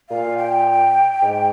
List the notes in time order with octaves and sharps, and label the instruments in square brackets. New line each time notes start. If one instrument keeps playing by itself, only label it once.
[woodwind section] A#2 [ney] F5
[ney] G5
[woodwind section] G#2